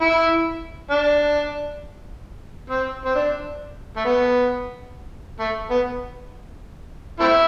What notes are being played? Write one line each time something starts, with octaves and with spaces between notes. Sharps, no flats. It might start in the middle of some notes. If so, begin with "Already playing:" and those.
E4
D4
C4
C4
D4
A3
B3
A3
B3
A3 C4 E4